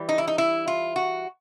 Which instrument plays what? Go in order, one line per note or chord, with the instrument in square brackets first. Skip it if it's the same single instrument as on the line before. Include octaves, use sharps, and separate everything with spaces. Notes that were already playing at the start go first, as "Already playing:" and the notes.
Already playing: [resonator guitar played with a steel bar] E3 G3
D#4
E4
D#4
E4
F4
F#4